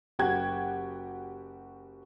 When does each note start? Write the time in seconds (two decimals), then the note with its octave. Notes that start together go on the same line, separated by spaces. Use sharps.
0.19 F#1 F#4 G4 G5 F#6 G#6